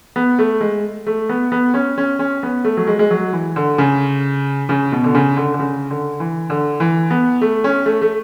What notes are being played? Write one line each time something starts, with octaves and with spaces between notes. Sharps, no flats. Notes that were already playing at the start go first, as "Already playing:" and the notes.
B3
A3
G#3
A3
B3
B3
C#4
C#4
C#4
B3
A3
F#3
G#3
G#3
F#3
E3
D3
C#3
C#3
B2
D3
C#3
D3
D3
C#3
D3
E3
D3
E3
B3
A3
C#4
A3
A3